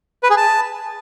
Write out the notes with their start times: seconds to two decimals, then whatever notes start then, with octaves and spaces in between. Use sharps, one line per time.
0.23 B4
0.30 G#4
0.37 A5